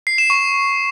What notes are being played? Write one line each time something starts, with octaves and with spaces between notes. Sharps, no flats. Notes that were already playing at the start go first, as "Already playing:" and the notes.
C7
E7
C#6